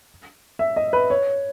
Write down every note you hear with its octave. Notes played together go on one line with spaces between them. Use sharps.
E5
D#5
B4
C#5